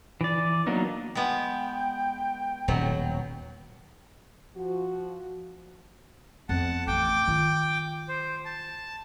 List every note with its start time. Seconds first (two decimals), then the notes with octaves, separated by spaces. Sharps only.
0.21 E3 D5
0.67 F#3 A#3 B3 D4 D#4
1.15 G#3 B3 G5
2.68 D#1 B2 F#3
4.56 F3 F#4
6.49 F2 B3 F#5 A5
6.87 A1 G5 D6
7.27 D#3 F4
8.09 C5
8.45 A5